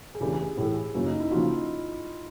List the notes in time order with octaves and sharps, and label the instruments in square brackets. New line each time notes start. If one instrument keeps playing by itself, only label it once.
[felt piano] G#4
[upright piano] E2 C#3 E3 A3 D4 [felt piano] G4
[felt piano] G#4
[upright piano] A2 E3 A3 [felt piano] E4
[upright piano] F#2 C#3 F#3 A#3 C#4 [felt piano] E4
[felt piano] D#4
E4
[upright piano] C#3 F3 A#3 D#4 F#4 [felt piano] F4